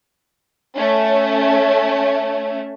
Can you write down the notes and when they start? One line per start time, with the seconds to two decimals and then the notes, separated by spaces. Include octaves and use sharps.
0.76 A3 C#4